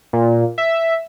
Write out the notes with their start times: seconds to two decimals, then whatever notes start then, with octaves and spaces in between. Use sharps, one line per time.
0.13 A#2
0.58 E5